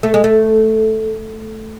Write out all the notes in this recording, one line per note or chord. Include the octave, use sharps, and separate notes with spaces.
A3
G#3
A3